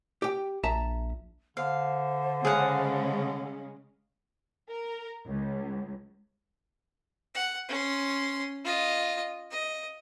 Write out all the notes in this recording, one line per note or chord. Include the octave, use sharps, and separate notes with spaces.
G4 G5
A#1 E5 A5 A#5
D3 C5 F5
C#3 G#3 C#4 G#4 F5 F#5
A#4
C#2
F#5
C#4 C6
F4 D#5
D#5